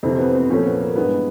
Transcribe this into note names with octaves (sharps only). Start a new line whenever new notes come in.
F2 C3 E3 C4
B3
C4
A#2 F3 A3 C#4
B3
A#3
G2 E3 G#3 B3